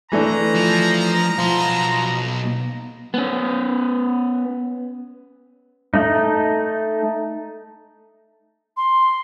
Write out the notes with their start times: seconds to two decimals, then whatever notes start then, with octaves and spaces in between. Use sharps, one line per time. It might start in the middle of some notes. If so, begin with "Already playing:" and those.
0.12 E3 A3 D4 D#5 A#5
0.55 F3
1.38 B1 F3 C6
3.14 B3 C#4
5.94 A3 D#4
8.77 C6